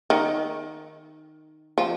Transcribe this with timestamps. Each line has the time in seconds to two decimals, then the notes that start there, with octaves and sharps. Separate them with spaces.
0.10 D#3
1.78 F3